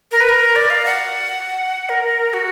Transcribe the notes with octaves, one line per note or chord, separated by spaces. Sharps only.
A#4
B4
A#4
D5
F5
F#5
A#4
F#4